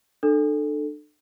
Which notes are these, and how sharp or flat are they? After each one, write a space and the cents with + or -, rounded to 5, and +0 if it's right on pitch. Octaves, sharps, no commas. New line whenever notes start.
D4 +40 A4 +0